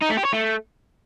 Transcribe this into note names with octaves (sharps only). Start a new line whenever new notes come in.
D#4
A3
G4
C#5
A3